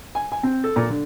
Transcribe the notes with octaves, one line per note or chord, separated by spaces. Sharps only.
G#5
G#5
C4
A4
A#2
D3